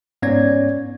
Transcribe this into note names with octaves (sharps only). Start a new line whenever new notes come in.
G#2 B3 C#4 C#5 D5 G#6